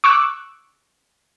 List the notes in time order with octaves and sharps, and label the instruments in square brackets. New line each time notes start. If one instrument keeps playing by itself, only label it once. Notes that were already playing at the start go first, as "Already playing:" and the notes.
[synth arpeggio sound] C#6 D6 E6 F#6